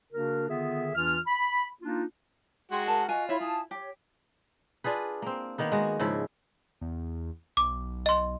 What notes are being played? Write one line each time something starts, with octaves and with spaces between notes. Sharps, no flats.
C#3 A#3 D4 F#4 A#4
D3 D#3 B3 F4 G#4 E5
E2 E3 D4 F4 F6
B5
A#3 D4 D#4 F4
G#3 D#4 F#4 G5 C6
A#4 F#5 A5
F4 F#4 D#5 G#5
E4 C#5 E5 B5 C6
E4 G#5 A5 D#6
G4 C#5
D4 F4 G#4 B4
A#3 C4
D#3 A#3 B3
G#3 F#4
G#2 C#3 F3 E4
E2
B1 D6
D#5 C6